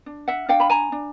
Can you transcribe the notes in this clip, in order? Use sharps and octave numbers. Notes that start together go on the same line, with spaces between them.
D4
E5 F#5
D4 F5 G5
B5
G#5 A#5
D4